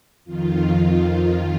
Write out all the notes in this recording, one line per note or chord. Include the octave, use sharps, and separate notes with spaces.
F2 D#3 F4